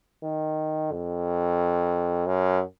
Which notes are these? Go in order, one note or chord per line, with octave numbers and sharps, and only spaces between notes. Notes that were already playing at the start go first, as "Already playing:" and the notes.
D#3
F2
F#2